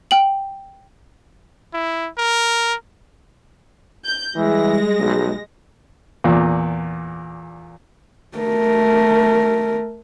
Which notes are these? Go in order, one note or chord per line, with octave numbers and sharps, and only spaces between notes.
G5 F#7
E4
A#4
G6
E3 G3 G#3 A#6
B1
E2 A#2
A3 A#4